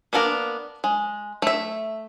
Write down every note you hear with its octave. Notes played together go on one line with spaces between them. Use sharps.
A#3 B3 D4 A4 A#4
G#3
A3 E5